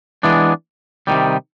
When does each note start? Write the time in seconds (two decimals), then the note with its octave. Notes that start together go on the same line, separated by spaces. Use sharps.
0.23 E3 G#3 B3 D4
1.07 C3 D#3 G3